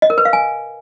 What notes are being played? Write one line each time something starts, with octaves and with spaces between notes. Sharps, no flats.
D#5
A#4
B4
F5
G#5